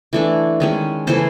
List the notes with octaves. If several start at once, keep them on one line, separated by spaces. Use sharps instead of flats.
E3 A3 D4
D#3 G#3 C#4
C#3 E3 A3 C5